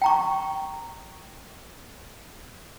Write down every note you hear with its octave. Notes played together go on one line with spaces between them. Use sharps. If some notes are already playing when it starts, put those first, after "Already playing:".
G5 A#5 C#6